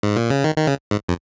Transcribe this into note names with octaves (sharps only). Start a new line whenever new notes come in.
G#2
A#2
C#3
D#3
D#3
C#3
G#2
F2